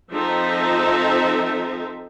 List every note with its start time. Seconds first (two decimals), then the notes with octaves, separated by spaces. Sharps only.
0.12 F3 C4 D#4 A4 C5 E5